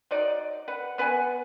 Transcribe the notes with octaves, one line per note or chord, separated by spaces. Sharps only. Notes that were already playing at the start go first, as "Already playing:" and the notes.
F#3 D#4 D5
B4 F#5
B3 B4 F#5 G#5